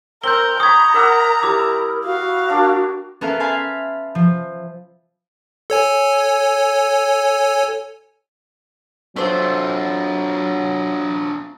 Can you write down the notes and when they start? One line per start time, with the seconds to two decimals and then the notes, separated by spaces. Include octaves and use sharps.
0.24 C4 A#4 G6 G7
0.60 A#5 B5 C#6 D#6 G#6
0.94 A#4 D5 E5 F#5
1.43 G3 E4 A#4 D6
2.05 F#4 F5
2.49 A#3 D4
3.21 B3 C#4 A4 A#4 E5 F5
3.40 E5 F5 G#5 A5 B5 C6
4.15 F3
5.70 A4 C#5 G#5
9.16 F#3 A3 C4 D4 F4 C5